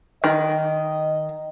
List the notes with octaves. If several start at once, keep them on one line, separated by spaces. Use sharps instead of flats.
D#3 D#5